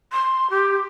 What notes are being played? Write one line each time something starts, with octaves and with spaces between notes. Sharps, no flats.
C6
G4